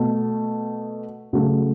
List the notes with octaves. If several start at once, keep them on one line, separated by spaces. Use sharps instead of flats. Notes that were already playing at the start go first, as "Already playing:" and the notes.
Already playing: B2 A3
C#3 F#3 A3